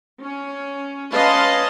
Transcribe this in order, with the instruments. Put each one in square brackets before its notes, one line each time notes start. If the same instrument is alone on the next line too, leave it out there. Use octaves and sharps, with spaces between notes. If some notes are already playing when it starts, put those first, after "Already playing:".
[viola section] C#4
C#4 B4 D#5 F5 A5 C6